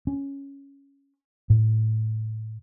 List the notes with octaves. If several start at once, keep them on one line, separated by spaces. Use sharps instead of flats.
C#4
A2